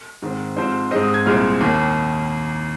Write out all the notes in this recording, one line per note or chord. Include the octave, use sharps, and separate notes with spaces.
G#2 D#3 C4
G#2 F3 C4 C5
G#2 G#3 C4 D#5
D#6
G#6
C2 A#2 G#3 C4 F6
D#2 D#3 A#3